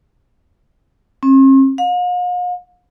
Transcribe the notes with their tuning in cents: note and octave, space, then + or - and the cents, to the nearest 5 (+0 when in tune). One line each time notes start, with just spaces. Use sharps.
C4 +45
F5 +45